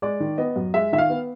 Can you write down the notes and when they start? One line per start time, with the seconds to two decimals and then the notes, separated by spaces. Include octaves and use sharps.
0.02 G#3 D5
0.20 D#3
0.38 B3 D#5
0.56 F#2
0.74 G#3 E5
0.93 D#3 E5
0.98 F5
1.10 B3